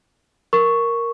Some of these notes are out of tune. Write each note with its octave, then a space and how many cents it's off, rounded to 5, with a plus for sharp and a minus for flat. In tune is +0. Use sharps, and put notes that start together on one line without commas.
A#4 +0 C#6 +0